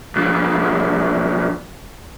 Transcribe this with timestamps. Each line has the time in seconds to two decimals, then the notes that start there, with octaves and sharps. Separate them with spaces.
0.16 B1 F3